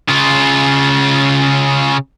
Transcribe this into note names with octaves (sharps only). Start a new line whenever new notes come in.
C#3 F4